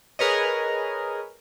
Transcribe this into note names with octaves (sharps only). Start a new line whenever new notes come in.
G#4 A#4 B4 C#5 D#5